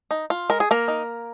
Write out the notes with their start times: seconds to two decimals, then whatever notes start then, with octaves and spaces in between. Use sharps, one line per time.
0.11 D#4
0.30 F4
0.50 G#3 A#4
0.60 G#4
0.71 A#3 A#4
0.88 D#4